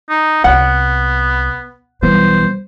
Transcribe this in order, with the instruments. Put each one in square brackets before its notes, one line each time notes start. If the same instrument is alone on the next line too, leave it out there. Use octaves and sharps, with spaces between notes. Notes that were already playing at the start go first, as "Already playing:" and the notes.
[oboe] D#4
[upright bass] C2 [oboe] B3 [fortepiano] F#5
[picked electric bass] B1 E3 B3 [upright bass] G3 [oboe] C5